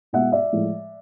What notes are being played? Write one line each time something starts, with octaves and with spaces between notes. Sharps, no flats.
B2 G#3 E5 F#5
D5 E5
A2 F3 G#3